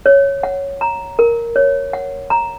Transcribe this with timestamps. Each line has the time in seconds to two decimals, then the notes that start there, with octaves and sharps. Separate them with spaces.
0.06 C#5
0.43 F#5
0.81 A#5
1.19 A#4
1.56 C#5
1.93 F#5
2.30 A#5